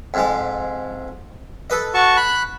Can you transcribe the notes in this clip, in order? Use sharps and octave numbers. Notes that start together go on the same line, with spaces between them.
F2 G#2 G#3
A4 B4 D#5
F#4 A5 C#6
B5 F#6